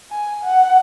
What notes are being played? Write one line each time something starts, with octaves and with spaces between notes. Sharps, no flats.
G#5
F#5